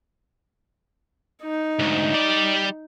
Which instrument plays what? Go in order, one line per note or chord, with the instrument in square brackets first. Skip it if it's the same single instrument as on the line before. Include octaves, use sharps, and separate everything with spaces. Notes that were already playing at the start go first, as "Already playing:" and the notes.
[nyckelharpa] D#4
[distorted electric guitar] D2 G#2
G3 D5